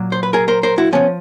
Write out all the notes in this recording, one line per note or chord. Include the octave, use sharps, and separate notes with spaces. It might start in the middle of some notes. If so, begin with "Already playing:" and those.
Already playing: A#2 F#3
C5
B4
G#4 A#4
A#4 C5
A#4 C5
E4 F#4
C#3 F3 B3 C#4